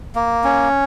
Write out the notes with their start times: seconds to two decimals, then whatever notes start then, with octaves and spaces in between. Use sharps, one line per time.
0.15 A#3
0.44 C#4